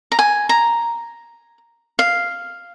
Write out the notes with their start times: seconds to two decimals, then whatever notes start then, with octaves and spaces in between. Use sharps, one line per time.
0.12 A#5
0.19 G#5
0.49 A#5
1.99 F5